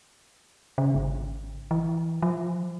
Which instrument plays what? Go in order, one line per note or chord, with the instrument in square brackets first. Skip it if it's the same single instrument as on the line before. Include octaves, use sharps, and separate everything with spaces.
[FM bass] C#3
G#1
E3
F3